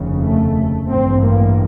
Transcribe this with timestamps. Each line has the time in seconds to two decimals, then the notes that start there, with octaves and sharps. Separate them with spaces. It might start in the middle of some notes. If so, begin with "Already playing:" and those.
Already playing: F1 D#2 C#3
0.22 A3
0.88 A1 G2 C4
1.22 A#3